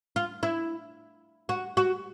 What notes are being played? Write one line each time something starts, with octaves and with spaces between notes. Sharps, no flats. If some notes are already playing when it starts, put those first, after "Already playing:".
F4
E4
F#4
F#4